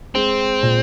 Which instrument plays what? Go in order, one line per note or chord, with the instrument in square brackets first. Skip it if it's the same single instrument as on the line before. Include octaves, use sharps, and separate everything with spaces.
[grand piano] G#3 [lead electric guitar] C4
[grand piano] A#2